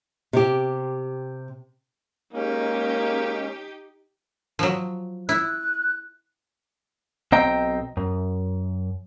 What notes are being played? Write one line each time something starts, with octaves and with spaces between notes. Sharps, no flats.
C3 G4
G#3 A#3 C#4 D#4 G4
F3 F#3
E4 F#6
B1 C4 D#5 G5 A#5
F#2